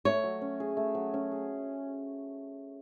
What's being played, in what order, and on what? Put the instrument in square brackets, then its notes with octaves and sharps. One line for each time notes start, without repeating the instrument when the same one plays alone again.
[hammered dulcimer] A3 [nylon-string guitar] C#5
[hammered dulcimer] F#3
C#4
G#4
A3
F#3
C#4
G#4